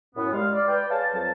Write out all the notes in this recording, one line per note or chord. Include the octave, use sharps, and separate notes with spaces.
F#2 A2 B3
G3 G#3 F5
D5
B4 D5 G5
G#4 B4 C#5 F5 A5
F2 F#3 A5